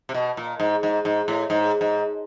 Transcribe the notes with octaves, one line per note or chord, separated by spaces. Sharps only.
C3
B2
A#2
G#2
G#2
G#2
A2
G#2
G#2